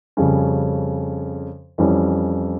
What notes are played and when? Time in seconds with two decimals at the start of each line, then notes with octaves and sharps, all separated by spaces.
0.17 F2 C#3 G3 C#4
1.78 F2 E3 G3 C#4